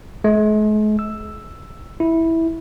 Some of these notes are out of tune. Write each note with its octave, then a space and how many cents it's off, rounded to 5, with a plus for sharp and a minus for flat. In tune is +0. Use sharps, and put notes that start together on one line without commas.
G#3 +45
E6 +5
E4 -10